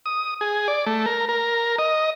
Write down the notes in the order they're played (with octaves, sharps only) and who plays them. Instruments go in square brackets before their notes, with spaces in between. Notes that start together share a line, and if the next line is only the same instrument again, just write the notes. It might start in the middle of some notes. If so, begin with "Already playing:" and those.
[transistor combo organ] D#6
G#4
D5
A3
A#4
A#4
D#5